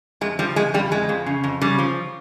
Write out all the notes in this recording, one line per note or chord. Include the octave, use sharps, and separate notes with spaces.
F2 G#3
F3 G3
F2 G#3
F2 G3
F2 G#3
F2
C#3
F2
C#3 G3
F3